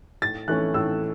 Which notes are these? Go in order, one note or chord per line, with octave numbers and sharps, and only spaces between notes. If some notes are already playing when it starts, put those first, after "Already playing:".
A2 A6
E3 A3 C#4 F#6
A2 E6